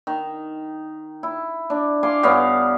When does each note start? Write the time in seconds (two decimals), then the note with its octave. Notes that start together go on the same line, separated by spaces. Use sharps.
0.07 D#3
1.23 E4
1.70 D4
2.03 F5 G#5 C6 D6
2.23 G2 B3 C#4 F5